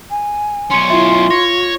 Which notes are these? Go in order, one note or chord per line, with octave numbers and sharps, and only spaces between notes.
G#5
B1 C#4 C6 C#7
E4 F4 E5 C6
C#5 A#6